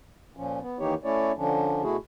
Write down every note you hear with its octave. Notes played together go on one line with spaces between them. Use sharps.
A#2 F3 C#4
B3
D#3 E3 A#3 D#4 G4 C#5
A3 C#4 E4 C#5 D5
D3 F3 C#4 D4
B2 A3 E4 F#4 G#4